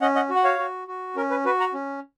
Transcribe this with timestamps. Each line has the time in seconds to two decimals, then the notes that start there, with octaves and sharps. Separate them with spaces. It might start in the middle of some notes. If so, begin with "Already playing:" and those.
0.01 C#4 D#5 F#5
0.15 D#5 F#5
0.30 F#4
0.36 F#5
0.44 C#5 F5
0.59 F#4
0.88 F#4
1.16 C#4 A#4
1.30 B4
1.45 F#4 B4
1.60 F#5 A#5
1.74 C#4